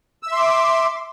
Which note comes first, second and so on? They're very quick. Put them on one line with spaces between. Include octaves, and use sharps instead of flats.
E6 E5 C6 D6